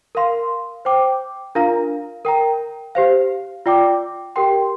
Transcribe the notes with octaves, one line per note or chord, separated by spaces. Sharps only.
A#4 F5 C6
C5 G5 D6
D4 F4 A#4 F5 A#5
A#4 G5 A#5
G4 C5 F5
F4 D5 G5 D6
G4 A#4 G5 C6